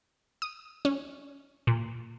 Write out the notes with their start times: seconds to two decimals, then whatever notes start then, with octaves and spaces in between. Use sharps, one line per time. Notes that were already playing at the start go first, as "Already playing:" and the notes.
0.42 D#6
0.85 C#4
1.67 A#2